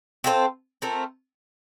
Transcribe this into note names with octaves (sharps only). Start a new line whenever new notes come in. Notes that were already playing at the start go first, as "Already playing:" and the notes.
C4 F4 A4 C5
A3 C4 F4 A#4